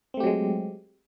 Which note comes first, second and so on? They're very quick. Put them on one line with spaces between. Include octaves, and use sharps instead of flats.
C4 A3 G4 F#3 G#3